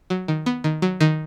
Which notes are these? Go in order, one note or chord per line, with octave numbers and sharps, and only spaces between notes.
F#3
D#3
B3
D#3
F#3
D#3